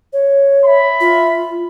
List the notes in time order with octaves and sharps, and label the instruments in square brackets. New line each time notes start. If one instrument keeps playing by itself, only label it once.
[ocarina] C#5
[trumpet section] E5 B5
[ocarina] F4